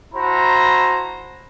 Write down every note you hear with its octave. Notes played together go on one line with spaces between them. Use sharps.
E4 F#4 C5 A5 A#5